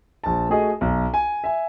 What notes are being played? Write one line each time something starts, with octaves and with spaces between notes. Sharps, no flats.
A#1 A5
A3 F#4 G#4 D#5
B1
G#5
E5 G#5